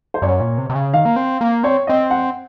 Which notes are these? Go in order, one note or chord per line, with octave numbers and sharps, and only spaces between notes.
C5
F#2 C#5
A#2
C3
C3
C#3
D#3 F5
A#3
C4
A#3
C4 C#5
C4 D#5
F#5